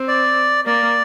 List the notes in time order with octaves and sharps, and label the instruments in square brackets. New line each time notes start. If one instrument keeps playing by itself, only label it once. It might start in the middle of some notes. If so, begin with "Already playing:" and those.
Already playing: [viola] C4
[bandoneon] D5
[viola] A#3 [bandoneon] D5